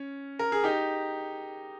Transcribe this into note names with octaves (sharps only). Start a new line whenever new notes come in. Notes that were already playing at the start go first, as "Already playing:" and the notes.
Already playing: C#4
A#4
G#4
D#4 G4